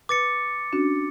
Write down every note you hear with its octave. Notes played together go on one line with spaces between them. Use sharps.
B4 D6 A6 C#7
C#4 D4 F#4